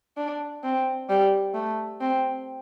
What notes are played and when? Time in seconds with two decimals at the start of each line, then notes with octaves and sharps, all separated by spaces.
0.17 D4
0.63 C4
1.09 G3
1.54 A3
2.01 C4